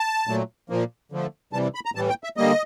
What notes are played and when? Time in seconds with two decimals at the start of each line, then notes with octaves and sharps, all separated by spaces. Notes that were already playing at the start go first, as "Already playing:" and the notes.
Already playing: A5
0.27 A#2 F#3 A3
0.69 A#2 F3 A#3
1.12 D3 F3 A3
1.53 C3 E3 G3 A5
1.75 B5
1.85 A#5
1.95 A2 E3 G3 A5
2.09 G5
2.24 E5
2.37 D3 G3 A#3 D#5